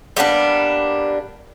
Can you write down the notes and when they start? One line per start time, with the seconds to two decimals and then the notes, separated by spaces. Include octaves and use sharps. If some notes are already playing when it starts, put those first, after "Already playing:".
0.17 G3 A#3 B3 D4